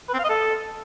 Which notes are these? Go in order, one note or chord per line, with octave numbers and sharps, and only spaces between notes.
B4
C4
F5
D#5
A4